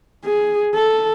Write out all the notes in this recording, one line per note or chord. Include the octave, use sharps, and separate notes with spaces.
G#4
A4